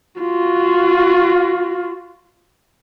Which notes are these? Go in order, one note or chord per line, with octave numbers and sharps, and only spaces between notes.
F4 F#4